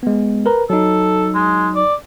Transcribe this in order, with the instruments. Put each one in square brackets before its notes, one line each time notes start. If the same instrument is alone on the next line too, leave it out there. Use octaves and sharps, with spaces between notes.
[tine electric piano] G#3 B3
A#4 B4 A#5
[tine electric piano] F#3 D#4 [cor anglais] A4
[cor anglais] G#3
D5